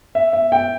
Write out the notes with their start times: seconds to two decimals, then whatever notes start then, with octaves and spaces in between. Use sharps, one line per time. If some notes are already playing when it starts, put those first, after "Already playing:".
0.15 E5
0.33 E5
0.52 G5